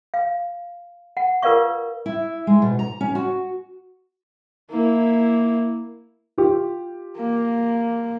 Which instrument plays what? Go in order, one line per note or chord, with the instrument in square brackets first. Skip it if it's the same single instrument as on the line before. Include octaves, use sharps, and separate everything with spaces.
[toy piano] F5
F#5
F4 A#4 B4 D5 F5 C#6
[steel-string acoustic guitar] E4
G#3
B2
A#5
C#4
F#4
[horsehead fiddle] A#3 E4
[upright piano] F4 G4
[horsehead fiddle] A#3